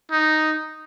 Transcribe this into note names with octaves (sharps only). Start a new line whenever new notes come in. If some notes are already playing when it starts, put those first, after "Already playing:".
D#4